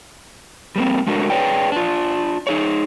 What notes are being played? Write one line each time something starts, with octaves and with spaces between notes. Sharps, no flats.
G3 A#3 C4
G#3 A3 D4 F#4 A#4
G#4 A4 B4 C#5 D5 G5
D4 F4
D#4 G#4 C#5